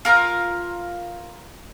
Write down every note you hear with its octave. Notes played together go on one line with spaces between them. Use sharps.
F4 A#4 F5 A#5